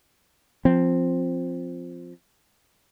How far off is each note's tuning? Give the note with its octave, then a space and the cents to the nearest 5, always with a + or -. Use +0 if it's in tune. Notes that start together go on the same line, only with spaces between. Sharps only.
F3 +0 C4 +0